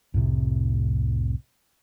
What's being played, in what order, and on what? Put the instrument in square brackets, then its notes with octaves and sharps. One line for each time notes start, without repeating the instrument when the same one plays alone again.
[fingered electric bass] C2 F2 A2 C3